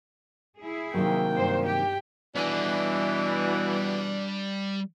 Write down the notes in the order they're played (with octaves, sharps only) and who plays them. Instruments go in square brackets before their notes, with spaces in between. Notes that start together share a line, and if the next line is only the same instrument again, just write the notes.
[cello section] E4 G#4
[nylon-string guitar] C3 D#3 F#3 [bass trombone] A#3 [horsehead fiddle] G5
[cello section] G2 C5
[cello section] G4 [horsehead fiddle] G5
[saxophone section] B2 E3 [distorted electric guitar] G3 G#5 [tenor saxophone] D4